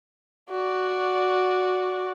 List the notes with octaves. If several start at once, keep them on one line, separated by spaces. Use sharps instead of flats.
F#4 D5